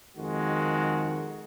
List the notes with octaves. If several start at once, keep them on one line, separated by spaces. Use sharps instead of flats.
F2 D#3 G#3 F#4